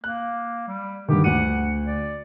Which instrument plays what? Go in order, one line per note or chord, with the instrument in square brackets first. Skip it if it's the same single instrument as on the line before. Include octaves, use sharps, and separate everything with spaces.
[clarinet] A#3 [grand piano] F#6
[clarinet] G3
[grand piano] G2 D3 D#3 [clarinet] G4
[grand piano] D2 D#7 [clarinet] F#5
[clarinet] D5